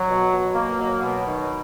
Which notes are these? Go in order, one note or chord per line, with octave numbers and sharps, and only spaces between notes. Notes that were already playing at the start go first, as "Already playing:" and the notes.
Already playing: F#3
B2
B2
A#3
F#3
B2
D#3